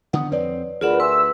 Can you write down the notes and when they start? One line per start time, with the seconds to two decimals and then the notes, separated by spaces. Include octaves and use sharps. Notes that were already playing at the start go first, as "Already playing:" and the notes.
0.13 D3 D#3 B3 F#5 D#6
0.32 F2 C4 B4 C#5 D5
0.81 D2 F4 G#4 A#4 B4 D5 F#5 E7
1.00 B4 E5 G#5 C6 E6